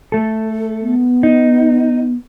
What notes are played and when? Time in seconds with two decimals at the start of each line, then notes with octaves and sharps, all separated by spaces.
0.12 A3 A4
0.81 B3
1.23 D#4